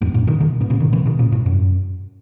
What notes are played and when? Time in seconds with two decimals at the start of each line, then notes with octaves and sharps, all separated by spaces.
0.01 E2 G#2
0.14 F#2 A#2
0.27 B2 D#3
0.40 B2 D#3
0.61 G#2 B2
0.70 A#2 C#3
0.80 B2 D#3
0.92 C#3 E3
1.05 B2 D#3
1.19 A#2 C#3
1.32 G#2 B2
1.46 F#2